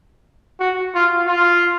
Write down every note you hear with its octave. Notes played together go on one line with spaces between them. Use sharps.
F#4
F4
F4